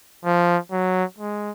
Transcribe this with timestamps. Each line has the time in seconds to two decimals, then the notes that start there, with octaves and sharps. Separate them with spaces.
0.25 F3
0.72 F#3
1.18 G#3